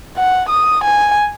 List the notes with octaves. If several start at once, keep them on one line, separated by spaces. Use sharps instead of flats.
F#5
D#6
G#5